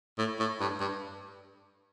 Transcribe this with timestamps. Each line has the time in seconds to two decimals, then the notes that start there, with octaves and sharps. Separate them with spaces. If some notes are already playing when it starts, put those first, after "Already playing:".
0.19 A2
0.40 A2
0.60 G2
0.80 G2